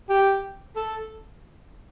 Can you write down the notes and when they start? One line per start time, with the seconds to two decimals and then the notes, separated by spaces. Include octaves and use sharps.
0.09 G4
0.76 A4